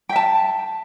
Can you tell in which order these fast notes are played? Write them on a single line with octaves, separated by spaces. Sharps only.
G5 E5 A5